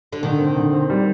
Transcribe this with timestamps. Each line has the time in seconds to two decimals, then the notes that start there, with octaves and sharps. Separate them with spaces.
0.12 D3
0.23 D3 D#3
0.40 C4
0.56 D3
0.73 C4
0.90 G3